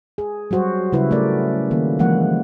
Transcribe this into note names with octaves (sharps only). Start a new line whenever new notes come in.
G#4
F#3 G3 F#4 C5
C#3 G3 E4 B4
A3 C#4 A#4 D5
D#3 A#3
E3 F3 G#3 A#3 F#5